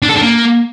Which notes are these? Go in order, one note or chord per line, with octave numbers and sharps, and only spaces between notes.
D4
A4
D4
A#3